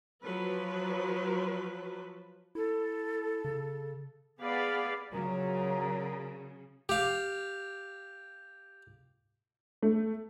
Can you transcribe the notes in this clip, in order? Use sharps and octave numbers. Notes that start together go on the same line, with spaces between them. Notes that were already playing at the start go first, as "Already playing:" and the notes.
F3 F#3 B4
E4 A4
C#3
B3 G#4 D5 F5 B5
A#2 C#3 F#3 A#5
G4 F5
A3